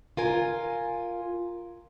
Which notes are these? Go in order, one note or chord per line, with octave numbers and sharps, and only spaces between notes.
F4 A#4 G#5